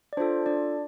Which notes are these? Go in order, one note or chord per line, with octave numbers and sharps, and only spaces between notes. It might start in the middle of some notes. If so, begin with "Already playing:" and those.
D5
D4 F4 A4 C5
D4 D5